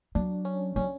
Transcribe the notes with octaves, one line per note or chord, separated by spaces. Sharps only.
F#3 D4
C#4
F#3 C#4